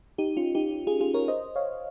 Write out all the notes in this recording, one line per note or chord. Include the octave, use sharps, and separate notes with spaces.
D#4 G4
C#4 F4
D#4 G4
F4 G#4
F4 G#4
A#4 C#5
C5 D#5
C#5 F5